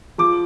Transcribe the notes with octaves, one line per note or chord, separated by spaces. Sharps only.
F3 D6